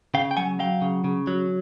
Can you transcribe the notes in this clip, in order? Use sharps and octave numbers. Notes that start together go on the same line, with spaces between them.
C#3 F5 G5
G5
F#3 F#5 G#5
F#3 F5 G5
C#3
C#3
F#3